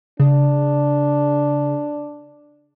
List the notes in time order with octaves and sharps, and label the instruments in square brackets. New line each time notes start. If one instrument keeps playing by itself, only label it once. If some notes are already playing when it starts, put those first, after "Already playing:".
[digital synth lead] C#3 [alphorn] D4